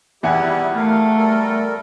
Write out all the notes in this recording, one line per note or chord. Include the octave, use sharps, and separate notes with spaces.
E2 G3 E4 G4 F#5 G#5
A3 A#4 F5
G3 A4 A#4